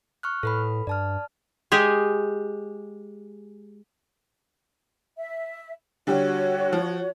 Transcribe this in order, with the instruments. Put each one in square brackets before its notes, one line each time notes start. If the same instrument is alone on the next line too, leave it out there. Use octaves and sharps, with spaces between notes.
[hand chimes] C#6 F6 F#6
[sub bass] A2 [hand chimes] A4 B4 B5
[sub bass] G2 [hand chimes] D5 A5 F6
[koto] G#3 G4 G#4
[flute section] E5
[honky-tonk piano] D3 G3 G4 [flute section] F#4 C#5
[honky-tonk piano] F3